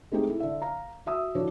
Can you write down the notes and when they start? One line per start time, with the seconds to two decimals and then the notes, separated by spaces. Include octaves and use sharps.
0.12 G#3 A3 C4 D#4 G4 G#4
0.27 E4 A4
0.40 D3 E5
0.62 F5 A#5
1.06 F#4 E5 D#6 E6
1.35 D3 F3 D4 E4 F#4 C#5